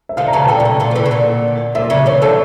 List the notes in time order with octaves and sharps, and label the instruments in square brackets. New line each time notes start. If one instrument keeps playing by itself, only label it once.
[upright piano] E5
[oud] D3 F3 [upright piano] F5
[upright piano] A#5
[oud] C#3 E3 [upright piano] A5
[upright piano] A5
[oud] A#2 D3 [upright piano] G5
[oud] A#2
C#3
A#2 D3
F3
C#3 E3
C#3
A#2 D3
[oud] A#2 [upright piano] E5
[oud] C#3 [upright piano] D5
[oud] C#3 E3 [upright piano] C#5
[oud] D3 F3 [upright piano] A4